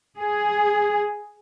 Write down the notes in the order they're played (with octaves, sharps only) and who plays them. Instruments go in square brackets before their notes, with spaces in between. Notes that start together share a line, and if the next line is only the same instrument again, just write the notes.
[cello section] G#4